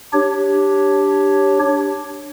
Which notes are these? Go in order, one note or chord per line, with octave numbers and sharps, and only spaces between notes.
D4 G4 C#5